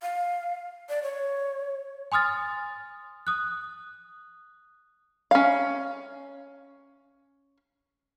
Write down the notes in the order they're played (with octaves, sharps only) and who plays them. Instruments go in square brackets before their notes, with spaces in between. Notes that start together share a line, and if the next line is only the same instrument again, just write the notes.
[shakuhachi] F5
D5
C#5
[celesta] G#5 C6 D#6 F6 A6
D#6 F#6
[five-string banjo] C#4 F5